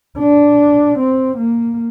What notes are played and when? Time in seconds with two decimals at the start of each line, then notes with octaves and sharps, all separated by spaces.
0.18 D4
0.98 C4
1.37 A#3